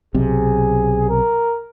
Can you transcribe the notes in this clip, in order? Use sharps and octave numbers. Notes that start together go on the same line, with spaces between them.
B1 C3 G#4
A#4